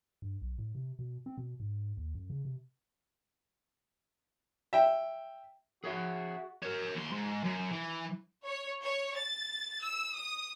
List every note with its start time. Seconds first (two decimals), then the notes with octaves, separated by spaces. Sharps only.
0.22 G2
0.42 B1
0.58 A2
0.75 C3
0.99 B2
1.26 C4
1.37 B2
1.60 G#2
1.97 D#2
2.15 F#2
2.30 C#3
2.45 C3
4.73 E5 G5
5.84 F#4 G#4 C#5 E5
6.63 A#4 C#5
6.95 D#2 C6
7.12 G#2
7.44 F#2
7.72 E3
8.45 C#5
8.81 C#5
9.15 A6
9.81 E6
10.13 D#6